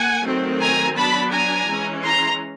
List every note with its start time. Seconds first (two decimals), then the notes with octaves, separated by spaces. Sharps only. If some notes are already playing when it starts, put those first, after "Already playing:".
Already playing: A#3 F#5 G#5
0.24 D#3 F#3 A3 C4
0.61 G#5 A#5
0.96 F#3 B3 D4 A5 B5
1.32 G#5 A#5
1.68 E3 G#3 C#4
2.04 A#5 C6